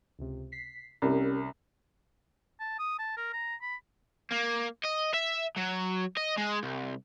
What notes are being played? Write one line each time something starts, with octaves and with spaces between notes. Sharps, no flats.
C#2 C3
B6 C7
C2 C#4 G4 A#4
A5
D#6
A5
A#4
A#5
B5
A#3
D#5
E5
F#3
D#5
G#3
C2